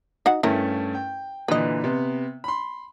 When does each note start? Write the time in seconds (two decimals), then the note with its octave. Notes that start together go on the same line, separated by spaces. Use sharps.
0.26 D#4 F#4 F#5
0.43 G2 A3 C#4 E4 A#4
0.95 G5
1.48 A#2 D3 E3 B4 D#5
1.84 C3 B3
2.44 B5 C6